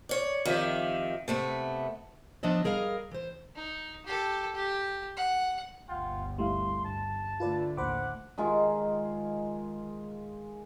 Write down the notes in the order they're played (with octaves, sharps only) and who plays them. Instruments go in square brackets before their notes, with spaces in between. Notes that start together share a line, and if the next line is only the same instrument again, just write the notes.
[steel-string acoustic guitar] C#5 D5
[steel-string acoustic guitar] F2 [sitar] D#3 G4 E5
[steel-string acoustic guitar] C3 A3 B3
F3 B3 D4 D#5 E5
G3 G#4 A#4 D#5 F5
E3 C5
[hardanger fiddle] D#4
G4 A4
G4
F#5
[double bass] G1 D2 [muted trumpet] F4 [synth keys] F#5 G5
[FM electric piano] G3 [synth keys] A3 E4 F5 [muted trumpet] C6
[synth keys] G2 [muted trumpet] A5
[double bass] D3 A3 [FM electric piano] F4 B4 D5
[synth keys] A#1 D#2 A2 [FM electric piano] C5 B5 D6 [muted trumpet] F#5
[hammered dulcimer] D#3 G#3 F4 G#4